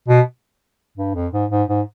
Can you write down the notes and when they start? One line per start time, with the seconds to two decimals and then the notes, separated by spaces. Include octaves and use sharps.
0.08 B2
0.98 G2
1.15 F2
1.33 G#2
1.51 G#2
1.69 G#2